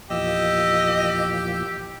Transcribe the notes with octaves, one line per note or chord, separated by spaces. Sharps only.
E2 A#2 F3 G4 D#5 E6